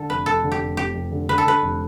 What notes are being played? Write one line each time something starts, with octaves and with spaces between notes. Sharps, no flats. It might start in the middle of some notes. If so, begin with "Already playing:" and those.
Already playing: D3 A4
F1 B4
F1 A4
D3
G4
F1
F1 G4
F1
D3
D3 B4
A4
D3 B4
F1